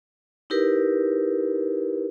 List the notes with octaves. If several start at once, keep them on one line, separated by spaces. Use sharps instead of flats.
D#4 E4 G4 A#4 B4